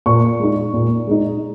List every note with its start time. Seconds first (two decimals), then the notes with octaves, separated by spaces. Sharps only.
0.06 A#2 C#6
0.39 G#3 D#4
0.73 A#2
1.07 G#3 D#4